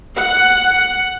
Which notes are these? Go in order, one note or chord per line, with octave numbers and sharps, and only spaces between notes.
F#5